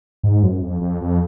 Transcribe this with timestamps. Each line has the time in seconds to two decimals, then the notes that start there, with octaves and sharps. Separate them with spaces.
0.23 G#2
0.43 F#2
0.62 F2
0.81 F2
1.01 F2